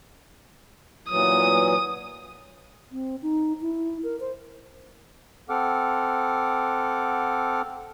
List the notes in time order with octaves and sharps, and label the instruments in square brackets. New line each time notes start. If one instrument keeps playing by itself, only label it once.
[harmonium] A#2 E3 F#3 [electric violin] D#6
[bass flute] C4
D#4
E4
A#4
C5
[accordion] C4 A4 F#5 D6 F6